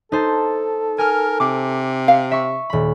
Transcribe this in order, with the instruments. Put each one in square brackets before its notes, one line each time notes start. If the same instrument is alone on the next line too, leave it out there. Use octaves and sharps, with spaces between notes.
[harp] D#4 C5 A5 [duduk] A4
[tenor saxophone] A#4 [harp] G#5 F6
[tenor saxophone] C3 [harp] D6
[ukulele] F5
[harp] E5 C#6
D#1 B5